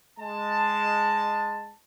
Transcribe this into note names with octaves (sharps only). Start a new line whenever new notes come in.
G#3 A5